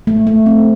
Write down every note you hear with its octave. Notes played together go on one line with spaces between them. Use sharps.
A3
A3
C4